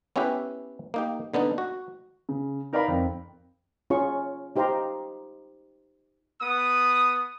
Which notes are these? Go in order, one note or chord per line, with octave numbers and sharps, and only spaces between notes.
B3 C#4 E4 G4 B4
A#3 D#4 G4
D3 B3 D4 D#4
F#4
C#3
D#4 A#4 D5 F5 B5
F2
C#4 F4 G#4 C#5 F5 C#6
D#4 G4 C5 F5 A#5 C6
B3 D#6